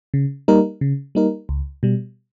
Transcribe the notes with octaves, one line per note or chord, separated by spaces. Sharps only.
C#3
G3 A#3 D#4 A#4
C#3
G3 A#3 D#4 A#4
C#2
B2 G3